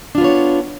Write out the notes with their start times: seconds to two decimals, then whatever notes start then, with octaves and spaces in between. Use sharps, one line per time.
0.15 D4
0.18 F4
0.21 B3
0.24 C#5